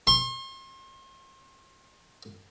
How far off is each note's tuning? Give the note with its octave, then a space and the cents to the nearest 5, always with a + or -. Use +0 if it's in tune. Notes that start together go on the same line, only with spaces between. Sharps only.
C6 +40